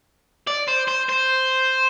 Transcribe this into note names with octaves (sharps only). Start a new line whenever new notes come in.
D5
C5
C5
C5